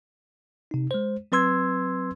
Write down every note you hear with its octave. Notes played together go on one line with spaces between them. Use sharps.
C3 D#4
G#3 C5
F#3 C4 B4 C6 E6 G#6